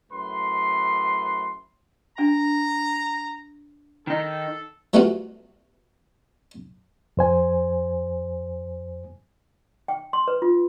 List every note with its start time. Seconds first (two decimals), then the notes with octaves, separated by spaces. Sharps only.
0.12 F#2 A2 B4 C6
2.18 D4 G#5 A#5
4.07 D#3 D#4 A4
4.94 E3 G3 A3 C4 F4 F#4
7.17 F2 C5 G#5
9.88 G5
10.13 C6
10.28 B4
10.42 F4